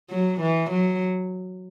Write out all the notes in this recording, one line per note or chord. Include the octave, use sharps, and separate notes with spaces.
F#3
E3
F#3